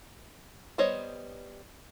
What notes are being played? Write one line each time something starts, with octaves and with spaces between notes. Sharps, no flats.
G3 B3 C5 C#5 D#5